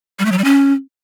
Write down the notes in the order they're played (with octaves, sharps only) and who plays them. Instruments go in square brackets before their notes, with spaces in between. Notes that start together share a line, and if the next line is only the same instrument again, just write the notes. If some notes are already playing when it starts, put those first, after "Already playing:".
[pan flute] G3
A3
F#3
G3
C#4